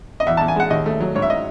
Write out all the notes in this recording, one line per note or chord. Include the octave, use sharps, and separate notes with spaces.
D#5
E2 E5
E2 A5
G#5
G#3 F#5
D#2 D#5
A3
F#3
G#2 C#5
E5
D#5